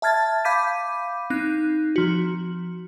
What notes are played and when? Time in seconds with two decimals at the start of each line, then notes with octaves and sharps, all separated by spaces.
0.02 E5 A5 F6 G#6 A6
0.45 F5 B5 D6 G6 B6 D#7
1.30 C4 D#4 F#6
1.96 F3 F#4